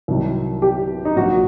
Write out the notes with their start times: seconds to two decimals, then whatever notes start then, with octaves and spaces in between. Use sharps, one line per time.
0.08 C2 C3 D#3 F#3
0.62 G4
1.05 D#4
1.16 A#1 A#2 F#3 F#4